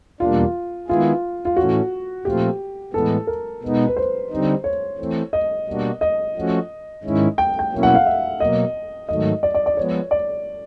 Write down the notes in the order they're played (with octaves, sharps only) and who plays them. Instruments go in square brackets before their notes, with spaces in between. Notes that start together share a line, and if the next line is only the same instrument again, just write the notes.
[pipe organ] E2 B2 G3 A#3 D4 [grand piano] F4
[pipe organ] D#3 G#3 B3 E4 G#4 [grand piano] F4
[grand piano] F4
[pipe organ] A2 E3 A3 C#4 [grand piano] F#4
[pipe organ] A#2 F3 A3 C4 F4 [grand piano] G4
[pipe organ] A2 E3 G#3 B3 [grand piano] A4
[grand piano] A#4
[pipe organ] B2 G#3 B3 D#4
[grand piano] B4
C5
[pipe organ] D3 G3 C4 D#4
[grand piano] C#5
[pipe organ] E3 A3 C4
[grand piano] D#5
[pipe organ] B2 G3 A#3 D4 F#4
[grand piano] D#5
[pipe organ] F3 A3 C#4 F#4
G#2 D#3 G#3 C#4 E4
[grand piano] G5
G5
[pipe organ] B2 F#3 A#3 C#4 E4
[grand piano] F#5
F5
E5
[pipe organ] B2 F#3 A#3 [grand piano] D#5
[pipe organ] G#2 D#3 F#3 A3 [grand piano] D#5
[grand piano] D5
D5
D5
[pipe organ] F3 G#3 B3 [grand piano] C#5
[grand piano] D5